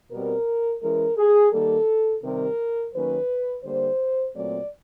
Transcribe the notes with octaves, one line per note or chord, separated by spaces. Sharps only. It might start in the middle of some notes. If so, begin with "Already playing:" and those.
B2 G3 C4 A#4
E3 G#3 C#4 A#4
G#4
D#3 G3 A#3 A4
C3 D#3 G3 C4 A#4
D#3 F#3 A#3 C#4 B4
D3 G3 A#3 C5
A#2 F#3 A3 C4 D5